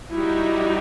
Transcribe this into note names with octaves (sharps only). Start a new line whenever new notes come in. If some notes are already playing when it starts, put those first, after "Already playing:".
G3 D#4 E4 F#4